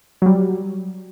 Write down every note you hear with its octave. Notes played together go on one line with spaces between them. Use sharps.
F#3 G3